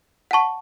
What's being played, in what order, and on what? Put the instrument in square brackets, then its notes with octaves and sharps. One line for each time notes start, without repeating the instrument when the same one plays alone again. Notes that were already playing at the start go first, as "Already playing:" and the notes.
[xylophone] F#5 A5 C#6